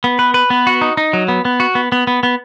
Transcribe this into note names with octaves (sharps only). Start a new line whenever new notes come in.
B3
B4
B4
B3
F#4
D#4
D#4
F#3
B3
B3
F#4
B3
B3
B3
B3